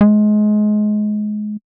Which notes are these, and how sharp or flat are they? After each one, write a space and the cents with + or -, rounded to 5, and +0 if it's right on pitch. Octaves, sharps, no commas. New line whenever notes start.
G#3 +25